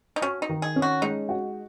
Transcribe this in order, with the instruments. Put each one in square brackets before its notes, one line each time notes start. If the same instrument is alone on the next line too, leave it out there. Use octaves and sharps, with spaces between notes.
[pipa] D#4
[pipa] C#4 [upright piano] F#4
[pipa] D#4
[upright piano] D#3
[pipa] G#4
[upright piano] C#4
[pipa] F#4
[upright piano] G#3 [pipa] D#4
[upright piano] F#4